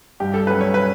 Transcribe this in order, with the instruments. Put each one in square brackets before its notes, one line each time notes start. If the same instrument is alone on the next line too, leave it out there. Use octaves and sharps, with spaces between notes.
[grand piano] G2 [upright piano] G4
[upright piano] A4
[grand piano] F#3 C#4 F#4 [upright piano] B4
[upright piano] C#5
B4